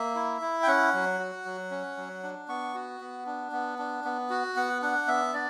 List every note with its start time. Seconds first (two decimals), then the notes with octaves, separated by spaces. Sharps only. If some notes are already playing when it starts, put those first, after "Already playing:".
Already playing: A#3 E5
0.15 E4
0.42 E4
0.63 G5
0.67 C#4 F#5
0.93 F#3
1.19 F#4
1.45 F#3
1.71 C#4
1.97 F#3
2.23 D4
2.48 B3 C#6
2.74 F#4
3.00 B3
3.26 D4
3.52 B3
3.79 D4
4.04 B3
4.30 F#4
4.56 B3 F#5
4.82 D4 F#5
5.08 B3 E5
5.34 D4 D5